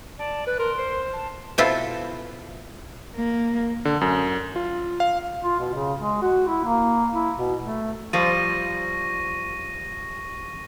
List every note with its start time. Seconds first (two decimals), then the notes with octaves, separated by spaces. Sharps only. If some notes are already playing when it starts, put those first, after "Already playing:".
0.19 D5 A5
0.47 B4 F#6
0.59 A#4 C6
0.78 C5
1.13 A5
1.58 B2 C4 E4 F4 A4
3.16 A#3
3.85 D3
4.01 F#2
4.56 F4
5.00 F5
5.43 F4
5.59 B2
5.73 C#3
5.98 G#3
6.22 F#4
6.47 E4
6.65 A#3
7.13 E4
7.37 B2
7.61 A3
8.13 F3 G3 C5 C#6 A#6 D#7